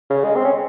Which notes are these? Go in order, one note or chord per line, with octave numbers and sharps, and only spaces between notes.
C#3
G#3
C4
C#4